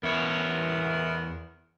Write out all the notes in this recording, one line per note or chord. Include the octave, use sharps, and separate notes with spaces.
E2 B3 E4 A#4 C#5